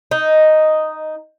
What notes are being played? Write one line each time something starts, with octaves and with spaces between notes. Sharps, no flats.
D#4